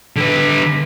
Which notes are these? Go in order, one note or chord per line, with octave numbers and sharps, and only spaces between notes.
D3 B4